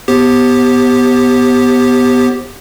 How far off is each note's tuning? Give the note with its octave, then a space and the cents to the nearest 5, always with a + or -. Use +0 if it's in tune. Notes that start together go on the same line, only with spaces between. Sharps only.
B3 +0 G4 +0 C5 +30